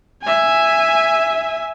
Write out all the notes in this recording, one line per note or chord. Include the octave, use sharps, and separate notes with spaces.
E5 G#5